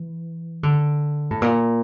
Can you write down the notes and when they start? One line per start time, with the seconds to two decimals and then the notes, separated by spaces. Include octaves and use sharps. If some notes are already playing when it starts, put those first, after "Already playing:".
Already playing: E3
0.63 D3
1.31 A2
1.42 A#2